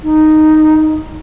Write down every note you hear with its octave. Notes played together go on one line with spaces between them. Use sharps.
D#4